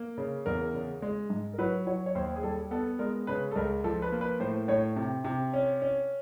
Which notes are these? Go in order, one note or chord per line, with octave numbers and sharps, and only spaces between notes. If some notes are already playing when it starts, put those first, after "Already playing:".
Already playing: A#3
C#3
E2 A#4
C#3
G#3
G#2
A#4
F#3 B4
F#3 C#5
C#5
D#2 C5
G#4
G3 A4
B3 A4
G#3 A#4
C#3 B4
A4
C#2 A#4
F3 A4
B4
A#3
B4
A2 C5
A2 C#5
C3
C3
C#4
C#4